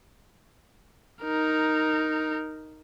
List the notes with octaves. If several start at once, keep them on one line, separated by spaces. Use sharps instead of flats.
D#4 A#4